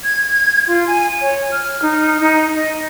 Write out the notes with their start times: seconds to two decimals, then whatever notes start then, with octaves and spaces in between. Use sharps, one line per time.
0.04 G#6
0.68 F4
0.87 G#5
1.21 C#5
1.52 F6
1.82 D#4
2.21 D#4
2.56 D#5